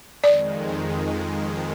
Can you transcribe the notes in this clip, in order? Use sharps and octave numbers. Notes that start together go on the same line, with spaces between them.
F2 D#3 G#3 D5